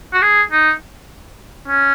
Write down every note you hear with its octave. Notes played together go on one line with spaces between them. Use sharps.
F#4
G#4
D#4
C#4